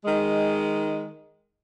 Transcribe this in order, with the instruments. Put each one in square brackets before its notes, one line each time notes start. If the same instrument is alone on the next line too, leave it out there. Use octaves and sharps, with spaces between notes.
[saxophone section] D#3 G#3